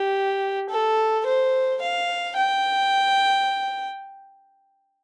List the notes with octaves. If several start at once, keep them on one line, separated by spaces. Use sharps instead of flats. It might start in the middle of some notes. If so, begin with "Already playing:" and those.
Already playing: G4
A4
C5
F5
G5